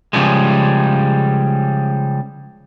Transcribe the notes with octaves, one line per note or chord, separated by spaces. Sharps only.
C#3 F3 G3 G#3